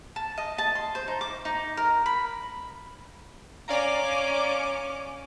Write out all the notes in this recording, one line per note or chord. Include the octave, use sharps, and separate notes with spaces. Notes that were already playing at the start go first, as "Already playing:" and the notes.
A5
D#5
A5
C6
C5
D#4
D6
D#4
A#4
B5
C#4 D5 F5 A#5 D6